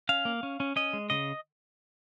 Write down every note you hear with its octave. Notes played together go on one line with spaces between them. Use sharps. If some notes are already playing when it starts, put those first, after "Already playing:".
C#4 F5
A#3
C#4
C#4
C#4 D#5
G#3
C#3 D#5